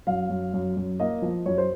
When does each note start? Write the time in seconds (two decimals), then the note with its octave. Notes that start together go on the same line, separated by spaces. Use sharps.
0.07 F#2 F5
0.30 F#2
0.54 F#2
0.77 F#2
1.00 A#3 D#5
1.22 F3
1.46 F#2 C#5
1.58 C5